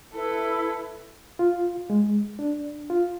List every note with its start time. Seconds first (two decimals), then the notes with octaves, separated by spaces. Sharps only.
0.14 E4 A4 B4
1.39 F4
1.90 G#3
2.39 D4
2.90 F4